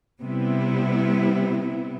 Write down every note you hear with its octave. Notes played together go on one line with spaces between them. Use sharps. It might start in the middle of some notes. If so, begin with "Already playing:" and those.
C3 G3 B3 E4